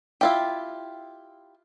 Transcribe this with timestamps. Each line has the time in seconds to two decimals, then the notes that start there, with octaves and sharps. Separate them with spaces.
0.21 E4 F4 G4